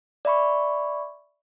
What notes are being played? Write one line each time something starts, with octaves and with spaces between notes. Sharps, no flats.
D5 E5 B5 C#6